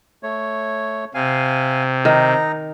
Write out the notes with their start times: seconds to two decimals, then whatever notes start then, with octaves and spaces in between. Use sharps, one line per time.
0.23 A3 C#5
1.14 C3 F5 G#5
2.05 D#3 D#4 A#5